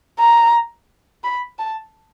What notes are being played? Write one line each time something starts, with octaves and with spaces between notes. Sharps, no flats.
A#5
B5
A5